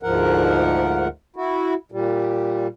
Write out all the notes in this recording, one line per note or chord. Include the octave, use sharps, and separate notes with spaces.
D2 G#2 F3 A#4 F#5
E4 F#4
A#2 G3